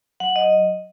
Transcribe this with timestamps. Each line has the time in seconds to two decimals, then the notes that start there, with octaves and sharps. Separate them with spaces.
0.20 F#3 F#5
0.36 D#5